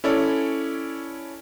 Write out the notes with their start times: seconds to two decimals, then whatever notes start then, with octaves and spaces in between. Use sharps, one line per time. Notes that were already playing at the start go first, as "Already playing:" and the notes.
0.04 C#4 E4 A4 C#5 D5